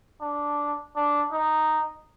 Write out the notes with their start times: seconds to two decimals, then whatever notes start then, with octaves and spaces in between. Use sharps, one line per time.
0.21 D4
0.96 D4
1.33 D#4